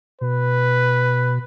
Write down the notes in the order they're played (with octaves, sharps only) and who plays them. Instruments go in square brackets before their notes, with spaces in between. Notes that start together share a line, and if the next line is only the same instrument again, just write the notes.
[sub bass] B2 [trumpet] B4